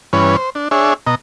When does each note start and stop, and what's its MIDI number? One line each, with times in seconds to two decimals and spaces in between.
0.13 0.36 43
0.13 0.36 52
0.13 0.36 61
0.13 0.36 71
0.13 0.36 73
0.36 0.50 72
0.55 0.68 62
0.71 0.94 62
0.71 0.94 68
0.71 0.94 73
0.71 0.94 76
1.07 1.15 47
1.07 1.15 75
1.07 1.15 82